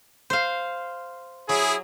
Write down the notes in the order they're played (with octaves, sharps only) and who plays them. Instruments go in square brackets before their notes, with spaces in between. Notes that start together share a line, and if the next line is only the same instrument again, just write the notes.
[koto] C5 F5
[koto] F#3 [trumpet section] E4 G#4